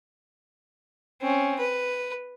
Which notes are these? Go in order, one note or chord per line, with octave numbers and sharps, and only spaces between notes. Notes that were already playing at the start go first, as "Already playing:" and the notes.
C4 C#4
B4